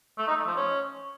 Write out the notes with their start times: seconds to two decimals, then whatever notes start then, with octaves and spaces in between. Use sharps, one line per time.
0.18 A3
0.28 D#4
0.37 A3
0.47 F3
0.56 C#4